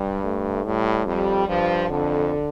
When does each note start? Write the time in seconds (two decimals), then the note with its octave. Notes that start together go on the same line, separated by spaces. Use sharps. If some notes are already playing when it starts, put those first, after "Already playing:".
Already playing: G2 G3
0.24 A3
0.65 A2 G3
1.06 F2 G3
1.48 G2 F3
1.89 F2 D3